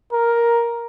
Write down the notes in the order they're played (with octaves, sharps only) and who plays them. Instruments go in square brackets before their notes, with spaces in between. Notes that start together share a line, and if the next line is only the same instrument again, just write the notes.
[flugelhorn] A#4